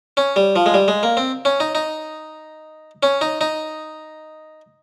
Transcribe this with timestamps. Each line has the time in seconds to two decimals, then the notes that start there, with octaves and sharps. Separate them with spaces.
0.17 C#4
0.36 G3
0.56 F3
0.66 G#3
0.74 G3
0.88 G#3
1.03 A#3
1.17 C4
1.45 C#4
1.60 D#4
1.75 D#4
3.03 C#4
3.21 D#4
3.41 D#4